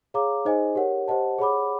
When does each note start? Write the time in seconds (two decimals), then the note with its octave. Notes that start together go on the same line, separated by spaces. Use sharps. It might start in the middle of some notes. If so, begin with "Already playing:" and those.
0.14 G#4 C#5 F5 A#5 D6
0.45 D#4 G#4 C5 D#5 G#5
0.75 G4 A#4 C#5 F#5
1.08 G4 C5 D#5 F#5 A5
1.38 G#4 C#5 F#5 B5 D6